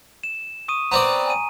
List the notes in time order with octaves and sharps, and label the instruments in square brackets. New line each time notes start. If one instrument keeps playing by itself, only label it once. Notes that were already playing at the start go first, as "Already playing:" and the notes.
[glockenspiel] E7
C#6 D#6 D#7
[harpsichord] B3 C4 D5 [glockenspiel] A#5
[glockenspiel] G#5 D#7